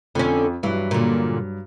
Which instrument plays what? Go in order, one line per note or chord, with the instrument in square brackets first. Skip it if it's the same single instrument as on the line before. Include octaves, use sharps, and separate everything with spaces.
[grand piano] F2 [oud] D3 C#4
[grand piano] G2 F#3 [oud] E3
[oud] A#2 D3